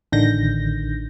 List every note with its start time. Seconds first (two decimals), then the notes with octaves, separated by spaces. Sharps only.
0.12 A1 D3 D#3 G6 A#6